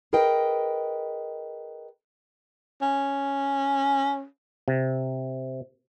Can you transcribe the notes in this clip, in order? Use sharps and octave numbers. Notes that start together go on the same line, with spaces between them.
G#4 A#4 B4 D#5 G5
C#4
C3